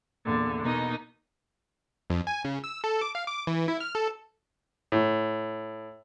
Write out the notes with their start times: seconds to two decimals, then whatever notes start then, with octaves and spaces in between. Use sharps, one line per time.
0.25 E2 A#2 D3
0.62 B2 A#3 D#4 D#5
2.10 F2
2.27 G#5
2.44 C#3
2.64 E6
2.84 A4
3.01 D6
3.15 F5
3.27 D6
3.47 E3
3.68 E4
3.80 F6
3.95 A4
4.92 A2